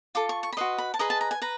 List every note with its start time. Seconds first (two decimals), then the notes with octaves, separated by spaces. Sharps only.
0.15 F4 A4 D6
0.29 C#6
0.43 C#6
0.53 B5
0.57 F#4 B4 D#5 C6
0.78 B5
0.94 A5
0.99 G#4 B4 D#5 A#5
1.10 A5
1.21 A#5
1.31 G#5
1.42 B4 A#5